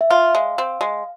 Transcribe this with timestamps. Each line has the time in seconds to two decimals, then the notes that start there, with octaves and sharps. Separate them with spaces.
0.01 E5
0.10 F4 F5
0.35 G#3
0.58 C4
0.81 G#3